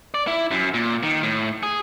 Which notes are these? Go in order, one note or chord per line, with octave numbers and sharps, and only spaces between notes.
D5
E4
F#2
A#2
D#3
A2
G#4